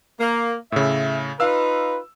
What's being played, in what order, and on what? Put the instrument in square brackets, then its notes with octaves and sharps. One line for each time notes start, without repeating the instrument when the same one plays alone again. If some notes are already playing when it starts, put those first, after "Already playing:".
[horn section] A#3
[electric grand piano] A2 C#3 [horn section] E5
[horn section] D#4 F4 B4 [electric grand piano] F5 E6